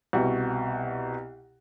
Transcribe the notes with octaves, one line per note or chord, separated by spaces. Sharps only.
C2 B2 F#4